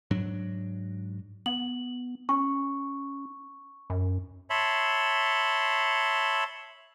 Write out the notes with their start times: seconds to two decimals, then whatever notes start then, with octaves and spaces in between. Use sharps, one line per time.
0.11 G#2 F#3 D4
1.46 B3 F#7
2.29 C#4 C#6
3.90 F#2
4.50 C#5 E5 A5 B5 C6